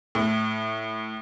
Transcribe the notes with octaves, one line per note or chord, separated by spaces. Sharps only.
A2